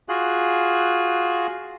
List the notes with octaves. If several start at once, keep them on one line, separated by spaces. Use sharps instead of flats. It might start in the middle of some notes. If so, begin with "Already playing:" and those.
F4 F#4 G#4 F#6